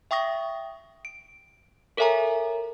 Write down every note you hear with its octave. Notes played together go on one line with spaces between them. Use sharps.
E5 G5 C#6 D#6 A#6
D7
A4 A#4 C#5 E5 G#5 A#5